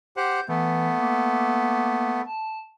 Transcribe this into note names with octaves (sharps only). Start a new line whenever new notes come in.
G4 C5 F#5 G6
E3 A3 B3
A#3
A5